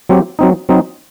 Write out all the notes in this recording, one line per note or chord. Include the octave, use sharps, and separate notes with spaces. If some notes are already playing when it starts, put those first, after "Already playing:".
F#3 C4 G4
F#3 C4 D#4
F#3 C4 D#4